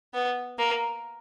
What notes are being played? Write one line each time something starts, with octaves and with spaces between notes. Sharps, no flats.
B3
A#3